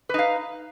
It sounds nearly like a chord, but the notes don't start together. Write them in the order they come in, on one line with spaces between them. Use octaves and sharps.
B4 D#4 F5